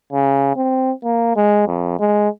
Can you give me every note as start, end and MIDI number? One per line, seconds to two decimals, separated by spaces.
0.12 0.52 49
0.56 0.92 60
1.04 1.36 58
1.36 1.65 56
1.67 1.98 41
2.00 2.28 56